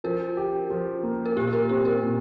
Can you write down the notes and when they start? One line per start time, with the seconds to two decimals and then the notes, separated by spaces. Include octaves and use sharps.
0.04 F3 A#4
0.37 G4
0.70 F3
1.03 A#3
1.25 A#4
1.36 A#2 G4
1.47 G4
1.53 A#4
1.69 C4 G4
1.85 A#4
2.02 A#2